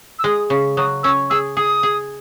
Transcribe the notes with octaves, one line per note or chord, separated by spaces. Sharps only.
E6
G#3 D#6
C#3
F#3 D#6
C#4 E6
G#4 E6
G#4 D#6
G#4